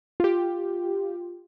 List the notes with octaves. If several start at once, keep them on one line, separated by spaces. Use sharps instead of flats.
F4 G4